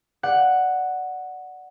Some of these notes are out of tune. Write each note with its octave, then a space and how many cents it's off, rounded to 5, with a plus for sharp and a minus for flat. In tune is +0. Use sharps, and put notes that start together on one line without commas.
D5 +5 F#5 +0